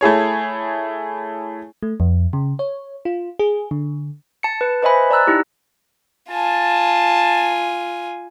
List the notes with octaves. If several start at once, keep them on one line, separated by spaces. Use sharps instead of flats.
A3 E4 G#4 C#5
A3
F2
C#3
C#5
F4
G#4
D3
A5 C#7
B4
B4 C5 D#5 E5 G#5 B5
D5 A5 A#5 E6 F#6
D#4 E4 G4
F4 G#5 A5